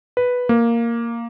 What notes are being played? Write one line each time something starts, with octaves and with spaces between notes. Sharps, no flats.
B4
A#3